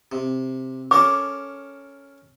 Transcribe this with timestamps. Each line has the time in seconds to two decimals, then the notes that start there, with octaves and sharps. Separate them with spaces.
0.12 C3
0.91 C#4 A4 A#4 D6